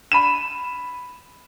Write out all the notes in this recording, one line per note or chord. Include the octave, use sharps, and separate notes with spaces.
B5 D#7 E7